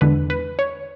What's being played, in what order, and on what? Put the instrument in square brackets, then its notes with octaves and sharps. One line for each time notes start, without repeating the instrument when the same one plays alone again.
[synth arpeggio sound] E2 D3 G#3 B4
B4
C#5